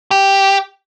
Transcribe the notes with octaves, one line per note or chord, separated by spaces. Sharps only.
G4